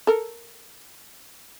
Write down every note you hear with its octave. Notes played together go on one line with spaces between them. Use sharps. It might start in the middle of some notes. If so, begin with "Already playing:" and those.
A4 A#4